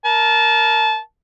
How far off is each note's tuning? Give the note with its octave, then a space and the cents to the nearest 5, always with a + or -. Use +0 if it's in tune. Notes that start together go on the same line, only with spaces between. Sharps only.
A#4 +0 A5 -20